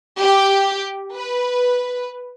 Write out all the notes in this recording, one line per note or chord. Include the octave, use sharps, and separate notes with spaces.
G4
B4